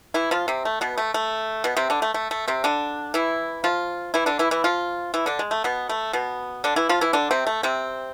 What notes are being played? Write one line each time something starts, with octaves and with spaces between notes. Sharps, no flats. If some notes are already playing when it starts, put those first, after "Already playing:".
E3 E4
F3 F4
C3 C4
A3
B2 B3
A3
A3
B2 B3
C3 C4
D3 D4
A3
A3
A3
C3 C4
D3 D4
E3 E4
F3 F4
E3 E4
D3 D4
E3 E4
E3 E4
F3 F4
E3 E4
D3 D4
G#3
A3
B2 B3
A3
B2 B3
D3 D4
E3 E4
F3 F4
E3 E4
D3 D4
C3 C4
A3
C3 C4